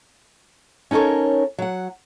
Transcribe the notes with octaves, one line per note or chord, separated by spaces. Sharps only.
C#4 D#4 A4 A#4 C#5
F#3 F#5